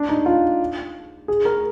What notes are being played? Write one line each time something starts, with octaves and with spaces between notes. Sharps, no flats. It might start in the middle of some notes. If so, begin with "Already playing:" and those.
Already playing: D4
D#4
F4
G#4
A#4